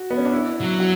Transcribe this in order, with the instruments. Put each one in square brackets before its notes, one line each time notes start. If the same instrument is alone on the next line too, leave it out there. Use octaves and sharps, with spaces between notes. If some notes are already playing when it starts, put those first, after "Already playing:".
Already playing: [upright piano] F#4
B3
C#4
D4
E4
[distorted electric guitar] F#3
[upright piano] F#4